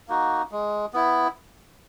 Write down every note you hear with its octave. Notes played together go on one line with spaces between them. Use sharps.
A#3 D#4 F#4
G#3
B3 E4